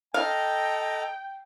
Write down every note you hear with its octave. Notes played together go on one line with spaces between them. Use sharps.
A4 D#5 F5 G5 A#5